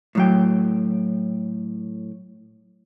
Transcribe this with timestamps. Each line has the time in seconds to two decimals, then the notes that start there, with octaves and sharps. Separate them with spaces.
0.15 A2 F#3 G5